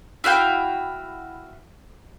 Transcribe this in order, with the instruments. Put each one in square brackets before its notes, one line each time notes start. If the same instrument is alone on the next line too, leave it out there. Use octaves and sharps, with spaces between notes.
[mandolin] E4 F#4 F5 G5